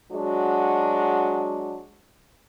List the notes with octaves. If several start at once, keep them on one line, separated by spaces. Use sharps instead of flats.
F#3 G#3 D4 F#4